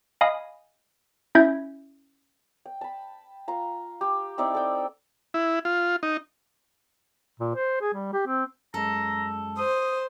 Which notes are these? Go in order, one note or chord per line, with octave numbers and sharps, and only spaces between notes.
D#5 F5 G#5 B5 D#6
C#4 E4 E5 G6 G#6
G5
A5 B5
F4 A#5
G4
C4 D#4 E4 D5
A4 G5
E4
F4
D#4
A#2
C5
G#4
G3
G4
C4
F#2 G#3 A4 A#5
C5 D#6